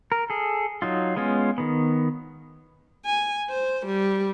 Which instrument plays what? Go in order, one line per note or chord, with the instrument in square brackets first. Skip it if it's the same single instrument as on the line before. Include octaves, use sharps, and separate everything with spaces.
[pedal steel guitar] A#4
G#4 A4
F#3 D#4 F4
G#3 B3 C#4 F4
D#3 B3
[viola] G#5
C5
G3